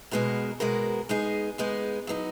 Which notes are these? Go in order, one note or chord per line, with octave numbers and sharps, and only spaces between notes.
B2 G#3 B3 F#4 A#4
B2 G#3 B3 F#4 A#4
G#3 B3 D#4 G#4
G#3 B3 D#4 G#4
F#3 B3 D#4